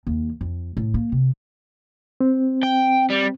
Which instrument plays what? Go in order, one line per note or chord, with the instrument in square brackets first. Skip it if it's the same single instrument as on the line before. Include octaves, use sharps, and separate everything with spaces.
[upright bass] D#2
F2
A2
A#3
C3
[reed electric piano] C4
[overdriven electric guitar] G5
G3